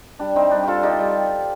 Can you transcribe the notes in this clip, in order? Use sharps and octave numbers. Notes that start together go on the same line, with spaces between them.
G3 D4
G3 C4 D#4
G3 D4
G3 F4 G4 A4
G3 D#4 G4
G3